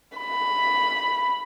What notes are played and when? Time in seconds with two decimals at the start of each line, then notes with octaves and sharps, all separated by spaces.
0.18 B5